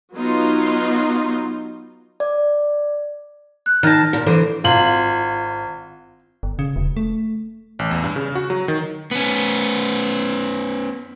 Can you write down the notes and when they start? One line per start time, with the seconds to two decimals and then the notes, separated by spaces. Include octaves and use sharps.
0.14 F#3 B3 D#4 F4 C6
2.20 D5
3.66 F#6
3.83 D#3 A5 F6 A#6
4.13 A#2
4.27 D2 E3 A4 C5
4.64 G#1 F4 F#7
6.43 G1
6.59 C#3
6.76 E1
6.97 A3
7.79 A1
7.91 E2
8.04 G2
8.16 C#3
8.35 F#4
8.50 F#3
8.68 D#3
9.11 B3 C#4